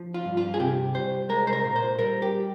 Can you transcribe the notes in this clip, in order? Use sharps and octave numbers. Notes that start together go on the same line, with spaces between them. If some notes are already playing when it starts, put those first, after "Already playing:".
Already playing: F3
F4
G2
F4
G#4
C3 G4
C2 C5
G#3 A#4
C5
A#4
A#2
C5
G3 A#4
G4